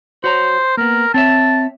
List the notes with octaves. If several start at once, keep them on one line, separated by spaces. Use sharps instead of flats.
F#4 C5 C#5 A#5
A#3 B3 A#4
C4 C#5 E5 A5